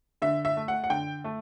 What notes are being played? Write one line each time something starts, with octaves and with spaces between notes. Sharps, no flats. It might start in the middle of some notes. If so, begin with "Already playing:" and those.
D3 E5
E5
A3
F#5
F#5
D3 G5
A3